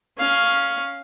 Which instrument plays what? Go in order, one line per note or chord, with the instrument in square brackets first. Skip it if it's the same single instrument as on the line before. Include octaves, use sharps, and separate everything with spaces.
[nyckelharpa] C#4 F5